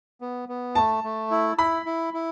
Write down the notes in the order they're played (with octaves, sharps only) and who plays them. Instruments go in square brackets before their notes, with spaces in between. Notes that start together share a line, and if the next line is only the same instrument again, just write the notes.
[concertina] B3
B3
[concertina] A3 [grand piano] A5
[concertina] A3
E4
[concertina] E4 [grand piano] B5
[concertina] E4
E4